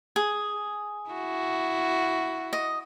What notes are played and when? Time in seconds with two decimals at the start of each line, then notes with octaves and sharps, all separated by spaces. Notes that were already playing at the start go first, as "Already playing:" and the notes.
0.16 G#4
1.10 E4 F#4
2.53 D#5